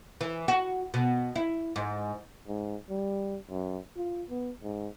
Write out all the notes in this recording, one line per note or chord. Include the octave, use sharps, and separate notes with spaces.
E3
F#4
B2
E4
G#2
G#2
G3
F#2
F4
B3
G#2